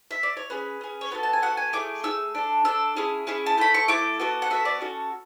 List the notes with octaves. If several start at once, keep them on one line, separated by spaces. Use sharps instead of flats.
E5
D5
C#5
C#4 G#4 B4
C#4 G#4
C#5
B3 F#4 A4 B4
A5
G#5
B3 F#4 A4 F#5
G#5
A3 E4 G#4 D6
A3 E4 G#4 E6
D4 A4
D4 A4 E6
C#4 E4 G#4
C#4 E4 G#4
A5
A3 E4 A4 B5
C#6
A3 E4 A4 D6
B3 F#4 A4
F#5
B3 F#4 A4 E5
D5
C#4 F#4 A4